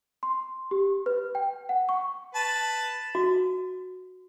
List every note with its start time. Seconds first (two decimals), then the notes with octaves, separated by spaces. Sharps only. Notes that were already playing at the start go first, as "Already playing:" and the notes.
0.23 C6
0.71 G4
1.06 B4
1.35 G5
1.69 F#5
1.89 C#6
2.35 B4 A5
3.15 F#4